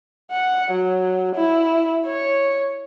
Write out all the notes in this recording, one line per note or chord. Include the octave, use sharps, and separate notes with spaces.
F#5
F#3
E4
C#5